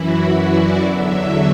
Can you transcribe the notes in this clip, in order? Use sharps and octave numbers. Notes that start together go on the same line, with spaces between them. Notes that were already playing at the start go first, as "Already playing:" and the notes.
Already playing: F#2 E3 E4 F#4
D5
E2 D3 F#3 E5